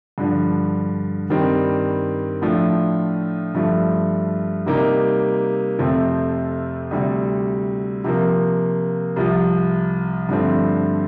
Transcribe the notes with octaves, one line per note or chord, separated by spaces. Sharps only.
G2 D3 F3
G2 D#3 G3 C4
A2 F3 A3 D4
G2 F3 A3
C3 G3 A#3 D#4 G4
F2 C3 F3 A3 C4
D2 C3 G3
C3 F3 A#3
C2 C3 F3
G2 D3 F3 A3 C4